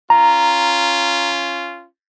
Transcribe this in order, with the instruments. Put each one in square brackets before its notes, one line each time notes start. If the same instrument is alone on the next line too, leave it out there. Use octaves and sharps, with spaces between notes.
[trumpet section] C#4 F4 [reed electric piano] A#5